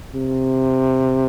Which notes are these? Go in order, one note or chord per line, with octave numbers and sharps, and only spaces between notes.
C3